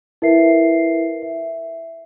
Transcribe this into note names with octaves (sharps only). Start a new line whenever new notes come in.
E4 A#4 B4 E5 C7
E5